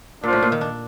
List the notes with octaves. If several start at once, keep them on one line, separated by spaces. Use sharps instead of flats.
A#2 D4 F4 C5
A2
A#2
D#3
D4